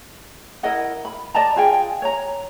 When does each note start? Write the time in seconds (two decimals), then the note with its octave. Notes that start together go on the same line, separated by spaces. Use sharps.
0.63 E4 A#4 D#5 F#5
1.05 B5
1.35 D5 D#5 A5 A#5
1.56 F4 G#4 G5
2.02 C#5 A#5